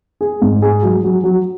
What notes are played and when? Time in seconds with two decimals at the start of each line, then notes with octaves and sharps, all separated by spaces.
0.21 G#4
0.42 G#2
0.62 G#4
0.83 F#3
1.04 F#3
1.24 F#3